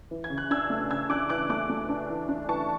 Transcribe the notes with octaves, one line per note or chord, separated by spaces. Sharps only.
E3
G#6
C#3
F#6
D4 E6 G#6
A3
C#3 E6 G#6
D4 D6 F#6
E3 D6 F#6
A3 D6 F#6
A3
D4
E3
D4
E3 A5 C#6